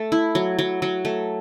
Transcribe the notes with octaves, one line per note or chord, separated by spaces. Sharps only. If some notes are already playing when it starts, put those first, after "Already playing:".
Already playing: A3
E4
F#3
F#3
F#3
A3